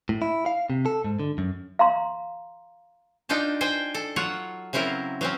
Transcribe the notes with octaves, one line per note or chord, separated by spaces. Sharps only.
A2
E4
F5
C3
A4
G#2
D3
F#2
F5 A#5 C6
D4 D#4 F4 G5 A5
C5 G5 G#5
A4
F#3 F4 C#5 F#5
C#3 F#3 C4 E4 A#4
F#3 C4 C#4